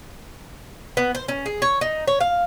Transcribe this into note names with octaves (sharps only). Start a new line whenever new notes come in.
B3
C5
C#4
G#4
C#5
D#4
C#5
F5